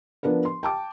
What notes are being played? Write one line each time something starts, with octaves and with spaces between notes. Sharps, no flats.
F3 B3 D4 A#4 B4
C6
G5 A5 D6